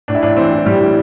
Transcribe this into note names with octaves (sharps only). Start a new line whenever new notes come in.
A2 D4
E4
A1 D4
E3 C4
E3
A2 G3
E3